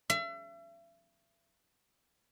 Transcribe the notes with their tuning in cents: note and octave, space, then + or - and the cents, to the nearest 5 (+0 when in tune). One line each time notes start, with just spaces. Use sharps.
E5 +40